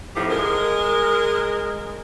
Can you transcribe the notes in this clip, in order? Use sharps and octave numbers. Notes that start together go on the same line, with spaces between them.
F2 A2 F3 D#4 G4
G#3 A#4